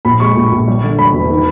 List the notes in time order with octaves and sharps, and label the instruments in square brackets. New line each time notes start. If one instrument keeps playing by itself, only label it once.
[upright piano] A#1 B5
G#3 C#6
A#1
A#1
G3
D3
G3 B5
E1
D#3